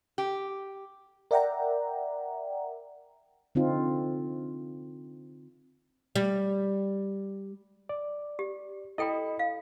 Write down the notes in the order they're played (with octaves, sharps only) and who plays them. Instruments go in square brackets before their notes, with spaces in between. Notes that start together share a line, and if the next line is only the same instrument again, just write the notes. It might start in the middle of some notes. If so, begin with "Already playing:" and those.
[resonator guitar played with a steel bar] G4
[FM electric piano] A#4 D5 E5 F#5 G5 A#5
[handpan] D3 C4 D#4 F4
[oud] G3
[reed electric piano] D5
[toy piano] G4
[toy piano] E4 A4 G5 [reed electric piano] D#5 B5
[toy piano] F5